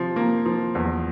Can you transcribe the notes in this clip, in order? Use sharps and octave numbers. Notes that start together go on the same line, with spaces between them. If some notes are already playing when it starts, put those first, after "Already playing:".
Already playing: C3 F3
A#3
F3
E2